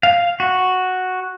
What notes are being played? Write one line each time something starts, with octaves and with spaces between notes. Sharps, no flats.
F5
F#4